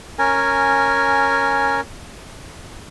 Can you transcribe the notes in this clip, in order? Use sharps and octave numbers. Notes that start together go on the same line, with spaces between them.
C#4 A#4 G#5